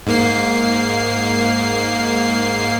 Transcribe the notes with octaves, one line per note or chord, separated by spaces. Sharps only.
G#2 A#3 C7